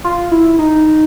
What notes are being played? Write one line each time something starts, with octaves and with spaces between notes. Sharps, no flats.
F4
E4
D#4